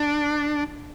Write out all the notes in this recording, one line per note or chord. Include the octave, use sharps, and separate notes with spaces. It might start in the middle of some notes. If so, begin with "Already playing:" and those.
Already playing: D4